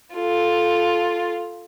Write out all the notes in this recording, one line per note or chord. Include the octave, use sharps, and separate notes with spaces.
F4 A4